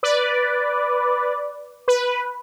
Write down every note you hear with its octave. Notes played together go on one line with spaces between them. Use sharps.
B4 D5
B4